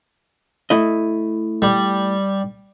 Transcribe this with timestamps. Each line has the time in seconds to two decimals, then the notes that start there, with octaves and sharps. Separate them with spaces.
0.70 A3 E4 D#5
1.62 G3